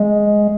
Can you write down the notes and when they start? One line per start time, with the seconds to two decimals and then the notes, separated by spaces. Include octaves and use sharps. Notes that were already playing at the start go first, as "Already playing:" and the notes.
Already playing: G#3